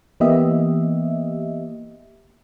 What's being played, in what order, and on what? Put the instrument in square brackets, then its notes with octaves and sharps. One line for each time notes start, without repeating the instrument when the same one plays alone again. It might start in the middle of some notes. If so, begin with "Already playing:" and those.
[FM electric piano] E3 A#3 B3 G4 D#5 E5